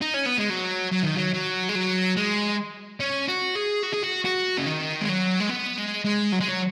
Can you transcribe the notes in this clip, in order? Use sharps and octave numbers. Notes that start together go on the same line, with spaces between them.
D#4
C#4
B3
G#3
F#3
F#3
D#3
F#3
F#3
G#3
F#3
G#3
C#4
F#4
G#4
F#4
G#4
F#4
F#4
C#3
D#3
G#3
F#3
G#3
B3
G#3
G#3
F#3
G#3
F#3